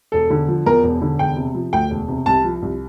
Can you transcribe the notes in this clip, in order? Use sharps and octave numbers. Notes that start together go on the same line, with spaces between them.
E1 A4
D3
F3
E2 A#4
E1
D3
E1 G5
C3
F3
D2 G5
E1
C3
C2 A5
F3
C2